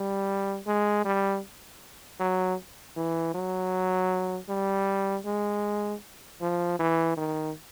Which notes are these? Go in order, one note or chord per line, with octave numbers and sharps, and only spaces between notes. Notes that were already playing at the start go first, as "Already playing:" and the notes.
Already playing: G3
G#3
G3
F#3
E3
F#3
G3
G#3
F3
E3
D#3